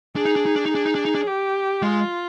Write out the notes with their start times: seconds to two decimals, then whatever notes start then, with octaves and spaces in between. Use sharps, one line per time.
0.16 D4 G#4
0.25 D#4
0.36 D4
0.46 D#4
0.56 D4
0.66 D#4
0.71 D4 G#4
0.86 D#4
0.95 D4
1.05 D#4
1.15 D4
1.27 G4
1.82 G#3 F4